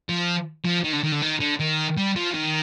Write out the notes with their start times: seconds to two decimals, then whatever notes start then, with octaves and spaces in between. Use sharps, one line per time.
0.09 F3
0.65 F3
0.84 D#3
0.93 D3
1.04 D#3
1.12 D3
1.22 D#3
1.40 D3
1.60 D#3
1.97 G3
2.16 F3
2.34 D#3